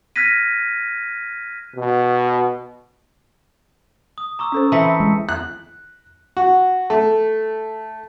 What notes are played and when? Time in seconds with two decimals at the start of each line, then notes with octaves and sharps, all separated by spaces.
0.16 F6 F#6 G#6 A#6 B6 D#7
1.76 B2
4.18 D#6
4.39 A#5 C#6 D6 E6
4.52 C#4 A4 C5
4.72 E3 C4 A5 B6 C#7
4.85 B5
5.00 G#3
5.29 F#6
6.37 F#4
6.90 A3